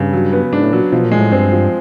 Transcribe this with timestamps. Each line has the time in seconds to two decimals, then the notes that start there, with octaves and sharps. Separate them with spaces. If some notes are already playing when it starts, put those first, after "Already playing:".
Already playing: G2 C#3
0.13 F#3
0.33 B3
0.52 G#2 D4
0.63 A2
0.72 A#2 F#3
0.92 B2 F3
1.05 A#2
1.11 G#3
1.18 A2
1.32 G2 C4
1.52 F3